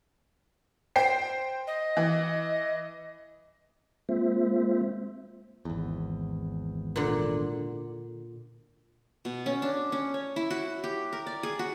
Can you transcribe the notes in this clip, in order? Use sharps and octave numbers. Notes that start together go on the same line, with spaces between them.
C5 G5 C7
D#5
E3
G#3 A#3 C4 F4 C5 E5
G#1 E2
A#2 D3
B2
C#4
D4
C#4
C#5
E4
F#4
G4
A#4
D5
G#4
F#4